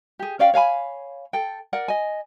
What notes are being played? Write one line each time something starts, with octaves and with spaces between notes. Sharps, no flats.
G4 G#4
C#4 D5 F5 G5
C#5 F5 G#5 B5
A4 G5
A#4 D5 F#5
D#5 G#5